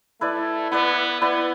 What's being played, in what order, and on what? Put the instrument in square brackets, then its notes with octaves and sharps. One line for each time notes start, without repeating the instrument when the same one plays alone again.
[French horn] A3 [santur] E4 B4 D5
[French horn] B3 [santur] E4 B4 D5
[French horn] B3 [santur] E4 B4 D5